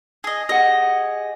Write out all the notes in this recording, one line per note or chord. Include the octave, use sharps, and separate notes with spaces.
G#4 D#5
G4 G#4 D#5 F#5